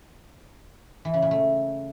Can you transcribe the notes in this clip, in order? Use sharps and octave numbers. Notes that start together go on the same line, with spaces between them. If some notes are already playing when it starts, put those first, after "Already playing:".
E3
C#3
A#2
A3